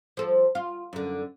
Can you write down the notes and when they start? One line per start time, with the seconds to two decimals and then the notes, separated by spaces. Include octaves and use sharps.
0.17 F3 A4
0.55 F4
0.93 F#2 D3